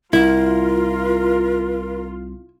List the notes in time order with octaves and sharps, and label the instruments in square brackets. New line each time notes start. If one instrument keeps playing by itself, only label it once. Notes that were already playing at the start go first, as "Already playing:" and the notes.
[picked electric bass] C2 [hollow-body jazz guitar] E4 [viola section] F4 [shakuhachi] A#4